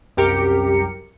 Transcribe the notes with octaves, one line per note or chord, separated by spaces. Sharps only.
C2 F#2 G4 A#4 C#7